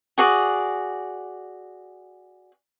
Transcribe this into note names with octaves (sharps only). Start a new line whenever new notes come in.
F#4 G#4 D5